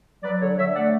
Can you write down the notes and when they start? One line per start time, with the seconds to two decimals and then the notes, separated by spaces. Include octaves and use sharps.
0.24 F#3 B4 D5
0.40 D3 A4 C#5
0.57 D3 C#5 E5
0.74 A3 D5 F#5